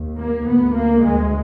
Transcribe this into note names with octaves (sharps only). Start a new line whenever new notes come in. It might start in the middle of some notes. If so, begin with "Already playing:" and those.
Already playing: D#2
A#3
D2 B3
A#3
D2 G#3